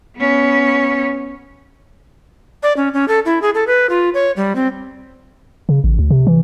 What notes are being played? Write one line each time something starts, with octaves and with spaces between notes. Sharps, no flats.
B3 C#4
D5
C#4
C#4
A4
E4
G#4
A4
B4
F4
C#5
G3
C4
C#3
A1
D2
C3
E3